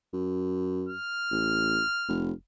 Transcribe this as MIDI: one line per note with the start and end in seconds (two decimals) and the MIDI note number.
0.13 0.94 42
0.89 2.33 89
1.31 1.81 33
2.08 2.32 29